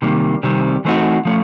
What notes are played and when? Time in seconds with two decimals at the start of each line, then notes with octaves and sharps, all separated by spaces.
0.02 C3 D#3 G3 A#3
0.43 C3 D#3 G3 C4
0.85 E3 A3 C4 D#4 F#4
1.25 F3 A3 C#4